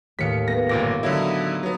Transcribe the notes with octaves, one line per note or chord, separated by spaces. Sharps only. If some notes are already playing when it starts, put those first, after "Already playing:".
D#2 A2 F5 B6 C#7
B3 A#6
G1 A#2 D6 A#6
D3 F#3 D#4 E4
F#3 B3